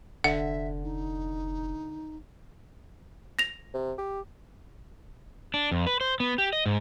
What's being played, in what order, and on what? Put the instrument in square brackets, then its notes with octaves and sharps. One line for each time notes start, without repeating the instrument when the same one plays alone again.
[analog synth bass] F1 [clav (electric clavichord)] D3 [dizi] E5 [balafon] F#5
[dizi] D#4
[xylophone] A#6 F7
[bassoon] C3
G4
[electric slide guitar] D4
F2
B4
C5
B3
G4
D#5
G#2